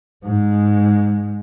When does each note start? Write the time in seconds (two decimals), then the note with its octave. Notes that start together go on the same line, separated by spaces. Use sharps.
0.23 G#2 G#3